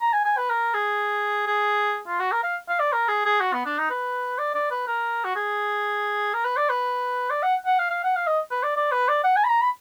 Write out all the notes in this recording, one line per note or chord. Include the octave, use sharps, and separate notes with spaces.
A#5
G#5
G#5
B4
A#4
G#4
G#4
F4
F#4
A#4
F5
F5
D5
A#4
G#4
G#4
F#4
B3
D4
D#4
B4
D5
D5
B4
A#4
F#4
G#4
A#4
B4
D5
B4
D5
F#5
F#5
F5
F5
F#5
F5
D#5
B4
D5
D5
B4
D5
F#5
G#5
B5
A#5
B5